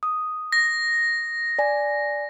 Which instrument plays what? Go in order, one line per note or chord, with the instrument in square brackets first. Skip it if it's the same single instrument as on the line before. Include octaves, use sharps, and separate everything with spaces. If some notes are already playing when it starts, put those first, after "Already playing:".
[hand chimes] D#6
[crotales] A#6
[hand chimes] D5 G#5